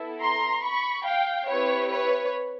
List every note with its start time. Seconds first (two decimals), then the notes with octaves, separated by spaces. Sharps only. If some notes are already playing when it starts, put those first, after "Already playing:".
Already playing: B3 E4 A4
0.20 A#5 C6
0.62 B5 C#6
1.04 F5 G5
1.47 C4 E4 G4 B4 C#5
1.90 B4 C#5